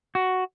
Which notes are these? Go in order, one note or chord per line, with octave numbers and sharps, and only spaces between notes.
F#4